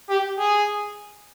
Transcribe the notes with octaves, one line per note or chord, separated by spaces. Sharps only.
G4
G#4